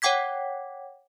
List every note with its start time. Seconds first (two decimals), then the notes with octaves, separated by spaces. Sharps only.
0.02 C#5 F#5 G5 D6 G#6 B6